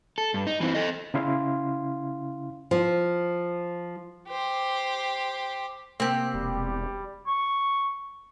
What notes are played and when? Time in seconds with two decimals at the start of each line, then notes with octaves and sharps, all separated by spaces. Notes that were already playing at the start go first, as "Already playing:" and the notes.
0.18 A4
0.34 G2
0.47 D#4
0.61 E3 C4
0.75 A4 D#5
1.14 C#3 C#4 E4 F5 C6
2.71 F3
4.28 G4 C5
6.00 C3 A#3 C4 G4 C5
6.34 E1 G3
7.27 C#6